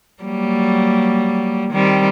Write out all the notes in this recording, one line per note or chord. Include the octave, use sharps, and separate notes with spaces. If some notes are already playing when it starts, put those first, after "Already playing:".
F#3 G3 A#3
D#3 G3 C4